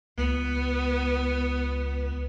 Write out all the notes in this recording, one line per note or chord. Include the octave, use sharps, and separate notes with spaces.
C#2 B3